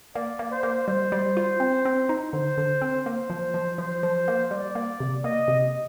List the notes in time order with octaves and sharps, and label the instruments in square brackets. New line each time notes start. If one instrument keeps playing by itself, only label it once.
[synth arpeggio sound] A#3 [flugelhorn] D5
[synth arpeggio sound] A#3
[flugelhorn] C5
[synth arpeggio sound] A#3
[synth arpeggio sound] G3 [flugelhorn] C5
[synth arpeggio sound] G3
F4
C4
C4
D#4
[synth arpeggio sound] D3 [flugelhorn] C5
[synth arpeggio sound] D3
C4
[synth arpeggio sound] A#3 [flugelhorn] C5
[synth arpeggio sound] F3
F3
[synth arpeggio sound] F3 [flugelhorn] C5
[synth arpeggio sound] F3
A#3
[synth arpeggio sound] G3 [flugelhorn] D5
[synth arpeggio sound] A#3
C3
[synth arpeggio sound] A#3 [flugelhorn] D#5
[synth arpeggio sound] C3